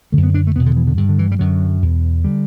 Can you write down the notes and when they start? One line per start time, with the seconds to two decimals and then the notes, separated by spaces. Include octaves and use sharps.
0.12 F#2 D3 A3
0.23 B3
0.34 D4
0.47 A3
0.55 E2 B3
0.59 B2
0.66 D3
0.76 E3
0.87 D3
0.97 G2 D3
1.09 D3
1.19 E3
1.32 G3
1.39 F#2 D3 F#3
1.82 E2 B2
2.24 D3 G3